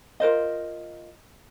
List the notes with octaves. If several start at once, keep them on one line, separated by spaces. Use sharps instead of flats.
F4 A#4 C5 D#5